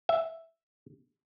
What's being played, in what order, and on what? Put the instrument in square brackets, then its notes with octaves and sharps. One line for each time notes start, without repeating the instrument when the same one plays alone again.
[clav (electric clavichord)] E5